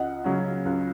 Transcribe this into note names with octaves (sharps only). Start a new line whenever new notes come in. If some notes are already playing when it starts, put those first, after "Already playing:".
Already playing: C#2 D#5 F#5
C#3 F#3 C#4
C#2